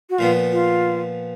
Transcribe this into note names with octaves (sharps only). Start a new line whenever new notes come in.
F#4
A#2 F3 B3 F4
F4